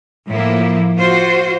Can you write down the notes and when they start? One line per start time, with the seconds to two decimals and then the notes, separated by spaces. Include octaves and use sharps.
0.29 A2 F3 A#3 E4
0.97 F4 F#4 C5